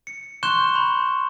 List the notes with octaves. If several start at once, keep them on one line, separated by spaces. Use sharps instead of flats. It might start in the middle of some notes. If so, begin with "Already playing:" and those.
C#7
C6 C#6 F#6 G6 E7 G7
B5